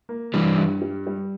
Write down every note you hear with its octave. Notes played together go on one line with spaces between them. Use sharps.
A#3
G2 E3 G3
G2
G3
G3